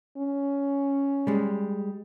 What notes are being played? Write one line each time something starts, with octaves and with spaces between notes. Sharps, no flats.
C#4
G3 G#3